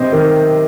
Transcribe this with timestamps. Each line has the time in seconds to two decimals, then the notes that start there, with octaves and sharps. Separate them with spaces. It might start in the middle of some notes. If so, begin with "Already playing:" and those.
Already playing: C3 C5 D#5
0.12 D#3